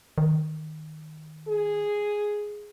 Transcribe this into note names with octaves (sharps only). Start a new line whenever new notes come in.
D#3
G#4